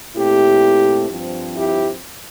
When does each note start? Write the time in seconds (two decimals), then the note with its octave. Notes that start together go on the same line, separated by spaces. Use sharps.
0.16 A#2 A3 C4 E4 G4
1.10 G2 F3 C4
1.56 E4 G4